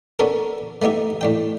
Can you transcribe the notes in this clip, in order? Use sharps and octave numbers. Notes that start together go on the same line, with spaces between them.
B3 C#4 D4 A4 A#4
A3 B3 D#4 G4 E5
A2 D4 G5